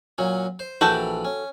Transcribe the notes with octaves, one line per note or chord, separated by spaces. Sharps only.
A#2 F#3 C#4
C5
A#1 E3 F#4 A4 G5 B5
C#4